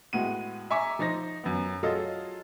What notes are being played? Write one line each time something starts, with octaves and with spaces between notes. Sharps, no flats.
A2 G#3 B3 F#4 D#7
E5 G#5 A#5 C#6 D6
F3 D#4 C5 A#6
F#2 B3
F#3 F4 G#4 A4 D#5